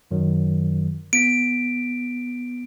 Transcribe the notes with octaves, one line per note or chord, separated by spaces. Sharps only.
F#2 D#3 F#3
B3 B6 D7